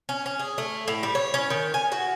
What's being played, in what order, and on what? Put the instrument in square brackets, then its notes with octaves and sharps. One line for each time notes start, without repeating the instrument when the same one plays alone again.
[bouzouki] C#4
C#4
G#4
A3
A2
G3
C#5
C#4
D#3
G#5
F#4